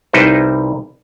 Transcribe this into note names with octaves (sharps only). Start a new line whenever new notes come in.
C2 G3 D#4 E4 B4 C5